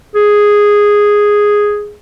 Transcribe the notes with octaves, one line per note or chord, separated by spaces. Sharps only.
G#4